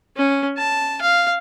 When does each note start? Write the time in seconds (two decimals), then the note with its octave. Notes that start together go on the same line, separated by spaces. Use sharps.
0.16 C#4
0.58 A5
1.02 F5